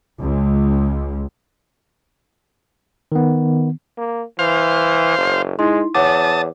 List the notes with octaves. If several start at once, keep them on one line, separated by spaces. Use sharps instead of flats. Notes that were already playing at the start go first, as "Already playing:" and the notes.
C#2
D#3 B3
A#3
E3 C5 F5 F7
F#1
G#3 D#4 E4 C6
E2 C#5 F#5 A5 D6 D#6